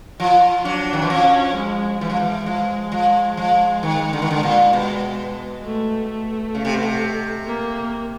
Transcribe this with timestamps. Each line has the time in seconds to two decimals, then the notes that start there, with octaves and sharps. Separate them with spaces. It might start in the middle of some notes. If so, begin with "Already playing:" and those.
0.20 F3 F4
0.65 F#3 D4
0.93 D#3
1.02 E3
1.10 F3 C#4
1.56 G#3
2.01 E3 G#3
2.10 F3
2.19 E3
2.46 F3
2.92 F3
3.37 F3
3.83 D#3
4.13 D3
4.22 D#3
4.31 D3
4.43 A#2
4.73 B2
5.65 A3
6.09 A3
6.55 C#3
6.65 C3
6.74 B2
6.83 C3
7.47 A#3